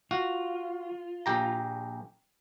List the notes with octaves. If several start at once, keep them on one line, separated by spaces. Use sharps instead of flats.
F4 F#4
A#1 G4 A#5